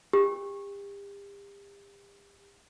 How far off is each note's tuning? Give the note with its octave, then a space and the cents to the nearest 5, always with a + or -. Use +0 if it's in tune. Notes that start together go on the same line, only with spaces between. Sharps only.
G4 +35